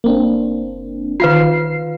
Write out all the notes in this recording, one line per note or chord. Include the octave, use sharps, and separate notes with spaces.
F#1 A#3 C4 D4
D#3 F4 B4 F5 C7